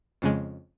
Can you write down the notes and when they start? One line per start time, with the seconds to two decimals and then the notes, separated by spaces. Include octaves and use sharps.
0.22 F2 C#3 G#3